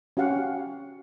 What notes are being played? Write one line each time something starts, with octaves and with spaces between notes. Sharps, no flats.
C#4 F#4 G4 F5 F#5